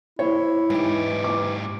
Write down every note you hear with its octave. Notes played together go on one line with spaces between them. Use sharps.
E4 C5 C#5
G#2 E3 D#4 G4
D6